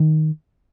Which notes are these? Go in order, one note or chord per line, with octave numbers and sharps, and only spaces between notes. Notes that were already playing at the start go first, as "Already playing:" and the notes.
Already playing: D#3